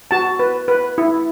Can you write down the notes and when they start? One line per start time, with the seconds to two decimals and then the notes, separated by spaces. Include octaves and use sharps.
0.11 F#4 A5
0.39 B4
0.68 B4
0.98 E4